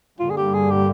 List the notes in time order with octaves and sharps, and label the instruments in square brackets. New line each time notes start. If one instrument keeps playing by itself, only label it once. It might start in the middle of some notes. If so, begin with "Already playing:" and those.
[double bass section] G2 D3 G3 A#3 [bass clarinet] F4
[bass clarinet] G#4
G4
G#4
G4